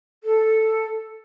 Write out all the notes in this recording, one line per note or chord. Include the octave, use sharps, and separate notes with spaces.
A4